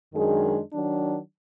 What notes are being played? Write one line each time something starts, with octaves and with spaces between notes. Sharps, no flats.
F#2 D#3 G#3 D4 G#4
D#3 F#3 D4